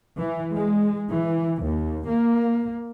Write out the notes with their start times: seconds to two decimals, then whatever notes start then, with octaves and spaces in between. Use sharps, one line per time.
0.16 E3
0.53 G#3
1.11 E3
1.62 D#2
2.08 A#3